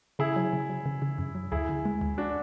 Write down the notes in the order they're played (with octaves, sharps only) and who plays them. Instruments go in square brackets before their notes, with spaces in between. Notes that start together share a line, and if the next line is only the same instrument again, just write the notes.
[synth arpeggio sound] C#3 [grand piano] E4 G#4
[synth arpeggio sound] F#3
C#3
F#3
C#3
C#3
F#2
F#3
[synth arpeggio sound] D2 [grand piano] E4 G#4
[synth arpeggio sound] D3
G#3
D2
[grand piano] D4 F#4